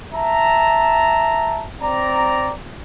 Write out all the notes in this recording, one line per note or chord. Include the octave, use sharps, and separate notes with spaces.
E5 A5 A#5
C4 D5 A#5